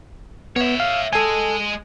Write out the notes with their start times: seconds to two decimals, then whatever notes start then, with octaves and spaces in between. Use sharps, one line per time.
0.56 B3 C#5 E5
0.80 F5
1.13 G#3 A4 D#5 G#5